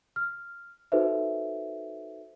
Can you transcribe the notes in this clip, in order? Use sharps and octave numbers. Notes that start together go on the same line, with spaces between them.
F6
D#4 F#4 A4 B4 C5 E5